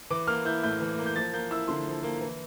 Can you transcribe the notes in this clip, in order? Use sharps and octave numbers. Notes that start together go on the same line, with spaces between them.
E3 D6
A#3 F6
E4 G6
A2 G6
E3
A#3
G6
F3 A6
A#3 G6
E4 E6
D3 C6
F3
A#3
E3